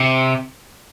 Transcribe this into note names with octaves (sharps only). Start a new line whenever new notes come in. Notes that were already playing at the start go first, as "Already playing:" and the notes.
Already playing: C3